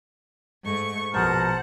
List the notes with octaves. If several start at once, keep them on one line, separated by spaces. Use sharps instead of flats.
G#2 A3 C#6
A#1 B2 A#4 C5 F#5 A5